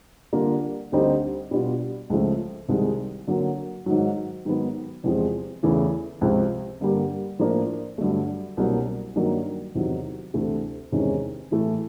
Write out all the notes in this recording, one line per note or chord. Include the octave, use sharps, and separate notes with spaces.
D3 G3 A#3 D4 F4
D2 D3 G3 C4 D#4
B2 G3 B3 D4 F4
C#2 C#3 F3 A3
C2 C3 D#3 G#3
D3 F#3 A#3
G#2 D#3 F#3
G#2 D#3 F#3 B3
E2 C3 F3 G#3 C4
E2 C#3 E3 A3
C#2 C3 F3
G2 D3 G3 A#3
A2 F3 A#3 D4
G2 D3 F#3 A3
C2 B2 F#3 A#3 D4
G2 D#3 F#3 A#3 D4
E2 C3 D#3 F#3
D2 C3 E3 A3
E2 C3 D#3 G#3 C#4
A2 E3 A3